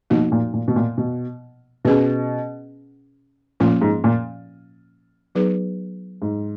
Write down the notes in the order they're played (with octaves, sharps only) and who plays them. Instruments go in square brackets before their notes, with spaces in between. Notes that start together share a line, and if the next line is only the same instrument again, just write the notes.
[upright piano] B2 [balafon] F3 A#3 D#4 F#4
[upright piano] A#2
A#2
B2
A#2
B2
[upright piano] B2 [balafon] C#4 G#4 B4
[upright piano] A#2 [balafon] F3 A#3 C#4 F4
[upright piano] G#2
A#2
[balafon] F#3 B3 D#4 G#4 B4
[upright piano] G#2